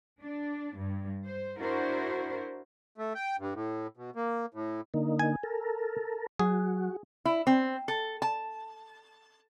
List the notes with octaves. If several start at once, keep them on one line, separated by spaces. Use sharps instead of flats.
D4
G2
C5
D4 E4 F#4 A#4 C5
A3
G5
G2
A2
B2
A#3
A2
D3 A#3 D#4
G#5
A4 A#4
F#3 F#4 G#4
E4
C4
A4
A5